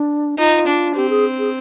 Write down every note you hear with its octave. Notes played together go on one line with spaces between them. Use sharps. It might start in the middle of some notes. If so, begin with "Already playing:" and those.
Already playing: D4
D#4 F4
D4
C4 G4
G#4
G#4